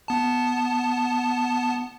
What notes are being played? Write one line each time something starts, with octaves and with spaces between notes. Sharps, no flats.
B3 A5